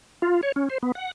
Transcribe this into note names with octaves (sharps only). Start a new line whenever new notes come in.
F4
C#5
C#4
C5
B3
F#5